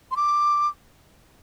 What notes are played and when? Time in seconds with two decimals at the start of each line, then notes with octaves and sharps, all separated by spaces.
0.11 C6
0.17 D6